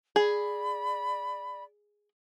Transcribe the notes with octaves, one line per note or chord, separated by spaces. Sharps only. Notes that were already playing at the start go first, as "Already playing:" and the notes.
G#4 D5 B5